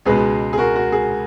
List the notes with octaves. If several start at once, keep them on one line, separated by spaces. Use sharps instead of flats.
C#2 B2 G#3 G#4 B4
G#4
F#4 A#4
F#4
G#4